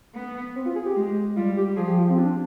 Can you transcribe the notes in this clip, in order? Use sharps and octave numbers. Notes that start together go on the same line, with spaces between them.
B3
C4
F4
G#4
G4
G#3
G3 F4
G4
F3 G#4
G4
F4
C4
D4